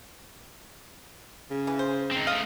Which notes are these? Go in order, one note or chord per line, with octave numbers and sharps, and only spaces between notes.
C#3
E3
C5
C4 D#4
A3 D#5 F5